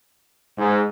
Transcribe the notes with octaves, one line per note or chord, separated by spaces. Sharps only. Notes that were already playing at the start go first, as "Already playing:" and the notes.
G#2